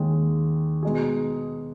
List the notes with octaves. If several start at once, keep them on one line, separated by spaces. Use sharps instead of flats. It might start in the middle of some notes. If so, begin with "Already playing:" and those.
Already playing: D#2 D#3 G#3
B2 G#3 D#4 G#4